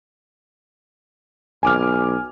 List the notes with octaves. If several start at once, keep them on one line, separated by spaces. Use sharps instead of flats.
B1 G#5 D6 F6